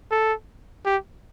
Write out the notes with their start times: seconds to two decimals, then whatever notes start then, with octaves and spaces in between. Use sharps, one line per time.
0.11 A4
0.85 G4